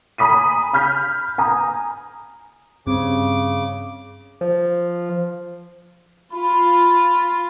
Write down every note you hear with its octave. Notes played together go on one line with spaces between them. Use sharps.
G#5 A#5 B5 D#6 B6 D#7
B5 F6 G6 B6
G#5 A#5 D#6
G2 C#3 C4 D6
F3
F4 B5